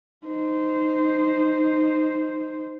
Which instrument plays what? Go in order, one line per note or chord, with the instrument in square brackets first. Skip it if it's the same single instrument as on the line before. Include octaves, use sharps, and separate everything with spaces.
[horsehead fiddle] D#4 C5